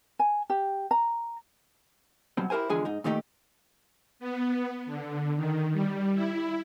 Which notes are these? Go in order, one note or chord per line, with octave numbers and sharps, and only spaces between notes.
G#5
G4
A#5
B2 F#3 G3 C4
E4 G4 A#4 C5 G#5
E2 D3 F3 G#3 G#4 G#5
G#2 D#4
A#2 D#3 A3 D#4 G4
B3
D3
D#3
G3
E4